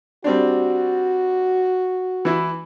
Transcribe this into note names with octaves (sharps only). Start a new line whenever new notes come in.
G3 C4 D4 F#4
E3 E4